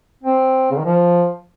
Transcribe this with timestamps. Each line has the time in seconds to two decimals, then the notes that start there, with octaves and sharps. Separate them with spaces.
0.23 C4
0.71 C#3
0.78 D#3
0.85 F3